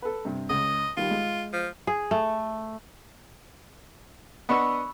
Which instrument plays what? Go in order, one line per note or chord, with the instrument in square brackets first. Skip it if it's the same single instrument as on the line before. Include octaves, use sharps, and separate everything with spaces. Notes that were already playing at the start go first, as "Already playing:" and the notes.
[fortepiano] A4 B4
G2 C3
[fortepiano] C#2 [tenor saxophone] D#5
[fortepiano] D#3 G3 [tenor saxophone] F4
[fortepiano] G#3
[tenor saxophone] F3
[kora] G#4
A3
[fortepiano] B3 D4 D#5 [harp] B5 C#6 E6